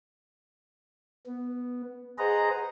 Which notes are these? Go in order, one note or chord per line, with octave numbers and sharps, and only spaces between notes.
B3
G#4 B4 C5 D#5 F#5 A#5